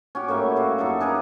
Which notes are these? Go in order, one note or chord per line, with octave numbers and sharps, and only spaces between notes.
C#4 F#4 G4
A2 G3 A#3 E5
G3 F#4 F5
F#2 D#4 A4 E5
D4 G#4 A#4 B4